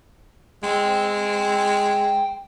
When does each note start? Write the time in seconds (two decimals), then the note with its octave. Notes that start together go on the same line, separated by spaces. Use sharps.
0.63 G#3 G5 C6